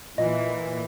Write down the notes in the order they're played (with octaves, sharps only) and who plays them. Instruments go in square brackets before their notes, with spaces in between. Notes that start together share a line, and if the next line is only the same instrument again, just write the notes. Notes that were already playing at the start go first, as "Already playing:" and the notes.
[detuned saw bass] A#2 [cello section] E3 [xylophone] D#5